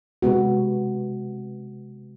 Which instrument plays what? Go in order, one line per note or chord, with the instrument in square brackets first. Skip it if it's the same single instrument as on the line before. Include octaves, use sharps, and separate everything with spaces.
[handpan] C3 G#3 B3 F#4